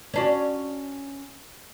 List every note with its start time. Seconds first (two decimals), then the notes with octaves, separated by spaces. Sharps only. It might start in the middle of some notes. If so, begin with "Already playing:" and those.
0.14 C#4 D4 F#4